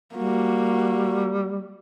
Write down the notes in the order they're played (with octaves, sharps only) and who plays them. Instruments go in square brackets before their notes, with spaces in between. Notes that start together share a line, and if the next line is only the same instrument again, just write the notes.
[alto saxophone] G3 [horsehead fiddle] A#3 F#4